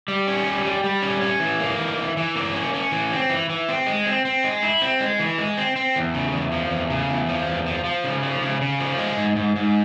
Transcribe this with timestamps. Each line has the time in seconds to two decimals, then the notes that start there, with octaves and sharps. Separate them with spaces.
0.08 G3
0.27 C#4
0.46 G3
0.65 G3
0.84 G3
1.02 C#4
1.21 C#4
1.40 E3
1.60 A#3
1.79 E3
1.97 E3
2.17 E3
2.35 A#3
2.54 C#4
2.74 C#4
2.92 E3
3.11 C4
3.29 E3
3.50 E3
3.69 C4
3.87 G#3
4.06 C4
4.25 C4
4.44 G#3
4.63 E4
4.82 C4
5.01 G#3
5.20 E3
5.38 G#3
5.57 C4
5.76 C4
5.96 E2
6.14 C#3
6.33 E2
6.52 F3
6.71 E2
6.90 C#3
7.10 E2
7.29 F3
7.47 E2
7.66 F3
7.84 F3
8.04 C#3
8.23 F3
8.42 C#3
8.61 C#3
8.80 F3
8.98 G#3
9.17 G#2
9.36 G#2
9.56 G#2